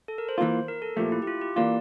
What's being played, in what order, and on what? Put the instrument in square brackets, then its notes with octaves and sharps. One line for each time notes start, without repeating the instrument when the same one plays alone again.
[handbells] A4
A#4
C5
[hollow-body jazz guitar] E3 A#3 F4
[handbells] A#4
A4
[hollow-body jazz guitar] A#2 F3 A3 [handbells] G4
[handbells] E4
G4
F4
G4
[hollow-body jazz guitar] E3 A#3 F4 [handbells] D5